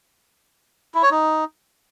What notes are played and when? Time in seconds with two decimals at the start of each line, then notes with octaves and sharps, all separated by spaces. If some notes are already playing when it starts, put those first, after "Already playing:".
0.94 E4
1.03 C#5
1.11 D#4